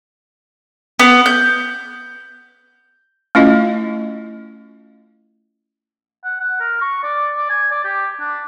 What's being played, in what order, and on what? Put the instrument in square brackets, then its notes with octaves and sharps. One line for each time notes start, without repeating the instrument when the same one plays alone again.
[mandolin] B3
G6
[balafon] A3 C#4 E4 F4 D#5
[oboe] F#5
F#5
A#4
C#6
D5
D5
G#5
D5
G4
D4